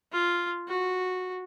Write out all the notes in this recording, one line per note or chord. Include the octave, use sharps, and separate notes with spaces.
F4
F#4